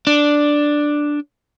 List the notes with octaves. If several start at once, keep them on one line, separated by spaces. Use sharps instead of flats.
D4